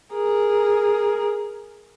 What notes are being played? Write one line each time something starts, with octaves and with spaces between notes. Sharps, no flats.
G#4 A#4